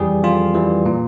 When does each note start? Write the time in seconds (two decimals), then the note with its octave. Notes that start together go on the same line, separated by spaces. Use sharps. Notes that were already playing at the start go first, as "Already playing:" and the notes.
Already playing: F2 E3 G3 G4 G#4
0.23 F2 F4
0.54 E3 G3
0.86 A#2